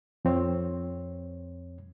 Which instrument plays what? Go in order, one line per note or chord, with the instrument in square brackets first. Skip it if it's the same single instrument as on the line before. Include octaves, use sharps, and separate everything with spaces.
[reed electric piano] F2 C4 C#5